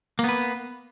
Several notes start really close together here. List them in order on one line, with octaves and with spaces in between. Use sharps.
A#3 B3 B4